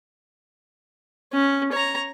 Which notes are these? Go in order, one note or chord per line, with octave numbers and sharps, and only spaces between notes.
C#4
C#5 A#5